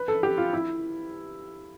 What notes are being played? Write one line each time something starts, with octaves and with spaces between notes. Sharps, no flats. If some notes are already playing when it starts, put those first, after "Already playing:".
Already playing: B4
A4
G4
F4
E4